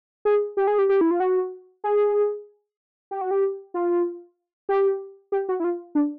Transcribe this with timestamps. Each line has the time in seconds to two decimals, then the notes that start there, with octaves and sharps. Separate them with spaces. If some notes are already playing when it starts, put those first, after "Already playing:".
0.25 G#4
0.57 G4
0.67 G#4
0.78 G4
0.89 G4
1.01 E4
1.11 F4
1.20 F#4
1.84 G#4
3.11 G4
3.21 F#4
3.31 G4
3.74 F4
4.69 G4
5.32 G4
5.49 F#4
5.60 E4
5.64 F4
5.95 D4